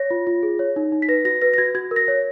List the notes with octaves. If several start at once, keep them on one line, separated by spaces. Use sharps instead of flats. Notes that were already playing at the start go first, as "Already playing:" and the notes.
Already playing: C#5 A#6
F4
F4
G#4
C#5
D#4
D#4
B6
B4 A#6
F#4 A#6
B4 A#6
A#6
F#4 G#6
F#4 G#6
A#4
A#6
C#5